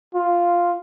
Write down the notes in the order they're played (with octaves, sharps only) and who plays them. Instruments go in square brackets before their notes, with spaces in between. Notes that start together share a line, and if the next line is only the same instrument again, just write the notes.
[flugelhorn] F4